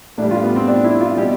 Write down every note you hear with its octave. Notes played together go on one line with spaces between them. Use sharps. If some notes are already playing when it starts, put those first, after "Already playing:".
A2 G3 D4
F4
B3
C4
D4
E4
F4
B2 G3 G4